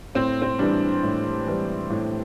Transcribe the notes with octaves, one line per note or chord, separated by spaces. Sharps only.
A2 C4
C4
E3 G3 D4
A2
E3 G3
A2